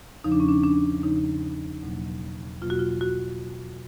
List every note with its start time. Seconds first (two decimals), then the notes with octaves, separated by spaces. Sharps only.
0.24 E2 C#3 F3 D#4
0.32 D4
0.40 C#4
0.48 D4
0.63 D4
1.03 E2 C#3 F3 D#4
1.82 E2 B2 F#3 A#3
2.61 E2 B2 F#3 A#3 F4
2.70 F#4
2.79 F4
3.01 F#4